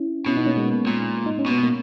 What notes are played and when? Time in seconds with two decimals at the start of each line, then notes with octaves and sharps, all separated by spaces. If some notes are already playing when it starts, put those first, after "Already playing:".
Already playing: C#4 E4
0.26 B2 C#4 E4
0.36 B3 D#4
0.46 A#3 C#4
0.56 G#3 B3
0.87 A#2
1.26 D#4
1.39 C#4
1.46 B2 B3
1.63 A#3